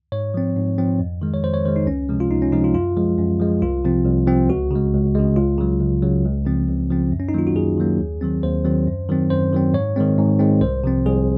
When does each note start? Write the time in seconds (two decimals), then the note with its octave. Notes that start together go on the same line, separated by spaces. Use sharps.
0.12 G#2 C#5
0.34 F3 C4
0.56 G#2
0.78 F3 C4
0.99 F2
1.22 D#3 G#3
1.34 C#5
1.43 F2 C5
1.54 C#5
1.65 D#3 G#3 C5
1.76 D#4
1.86 C#2 C#4
2.09 C3 F3 G#3
2.20 F4
2.31 C#2 D#4
2.42 C#4
2.52 C3 F3 G#3 D#4
2.64 F4
2.75 F#2 F4
2.97 F3 G#3
3.18 F#2
3.40 F3 G#3
3.62 C2 F4
3.84 C3 F3 C4
4.06 C2
4.27 C3 F3 C4
4.49 C#2 F#4
4.71 C#3 G#3
4.93 C#2
5.15 C#3 G#3
5.36 C#2 F4
5.58 C#3 F#3
5.81 C#2
6.03 C#3 F#3
6.24 C#2
6.46 C#3 F3 C4
6.68 C#2
6.90 C#3 F3 C4
7.12 F#2
7.20 C#4
7.29 D#4
7.34 D#3 F#3 A#3 F4
7.47 F#4
7.55 F#2 G#4
7.78 D#3 F#3 A#3
8.00 D#2
8.21 D#3 F#3 C4
8.43 D#2 C5
8.65 D#3 F#3 C4
8.87 F#2
9.09 D#3 F#3 C4
9.30 F#2 C5
9.53 D#3 F#3 C4
9.74 G#2 C#5
9.96 D#3 G#3 C4
10.18 G#2
10.40 D#3 G#3 C4
10.61 C2 C5
10.84 C3 F3 C4
11.06 C2 G#4